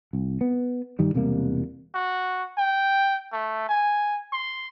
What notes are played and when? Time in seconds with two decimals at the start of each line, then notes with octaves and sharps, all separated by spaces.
0.13 C2
0.41 B3
0.99 G2 D#3 G3
1.14 E1 C3 G3 A#3
1.94 F#4
2.58 G5
3.32 A3
3.69 G#5
4.33 C6